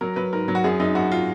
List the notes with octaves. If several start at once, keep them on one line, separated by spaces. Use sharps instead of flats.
F#3 A#4
F#3 B4
G#2 A#4
F#3
F#4
F#2 G#4
F#2 D#4
F#2 F#4
F4